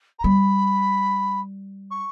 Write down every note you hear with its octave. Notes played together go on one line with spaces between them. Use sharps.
A#5
G3 B5
C#6